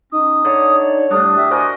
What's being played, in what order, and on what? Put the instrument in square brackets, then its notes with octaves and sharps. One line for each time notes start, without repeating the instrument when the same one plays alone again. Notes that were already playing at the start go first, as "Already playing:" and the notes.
[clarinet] C#4 [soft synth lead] D#4 [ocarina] D#6
[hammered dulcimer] D3 [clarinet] C#5
[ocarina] D5
[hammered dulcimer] A2 D4 [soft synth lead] G3 [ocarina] D#6
[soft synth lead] G4 [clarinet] E5
[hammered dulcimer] F#4 A#4 D#5 [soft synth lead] C5 [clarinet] G#5